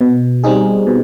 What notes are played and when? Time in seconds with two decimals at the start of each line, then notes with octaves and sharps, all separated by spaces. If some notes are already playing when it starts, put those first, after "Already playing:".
0.01 B2
0.44 G3 C4 D#4 G#4
0.87 B2